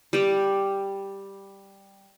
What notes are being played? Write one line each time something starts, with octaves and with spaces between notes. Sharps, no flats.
G3 G4